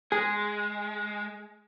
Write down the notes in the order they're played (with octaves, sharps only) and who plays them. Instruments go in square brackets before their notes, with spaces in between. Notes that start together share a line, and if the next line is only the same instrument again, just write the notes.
[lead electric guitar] G#3 [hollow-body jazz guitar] G#4